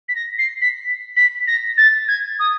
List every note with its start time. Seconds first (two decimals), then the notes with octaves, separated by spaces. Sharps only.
0.09 B6
0.15 A#6
0.39 C7
0.62 B6
1.16 B6
1.47 A#6
1.78 A6
2.08 G#6
2.39 D#6